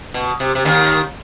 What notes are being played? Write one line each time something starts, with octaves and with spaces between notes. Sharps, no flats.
B2
C3
C3
D#2 D#3